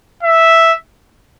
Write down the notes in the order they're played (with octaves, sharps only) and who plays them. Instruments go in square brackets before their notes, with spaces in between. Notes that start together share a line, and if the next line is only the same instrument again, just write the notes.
[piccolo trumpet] E5